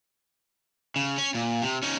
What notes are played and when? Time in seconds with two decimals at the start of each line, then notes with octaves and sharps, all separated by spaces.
0.96 C#3
1.18 C#4
1.35 A#2
1.62 C3
1.83 C#4 D#4